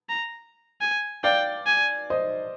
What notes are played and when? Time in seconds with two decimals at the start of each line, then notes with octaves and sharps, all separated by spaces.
0.09 A#5
0.81 G#5
1.24 D5 F5 G5
1.67 G#5
2.10 C5 D#5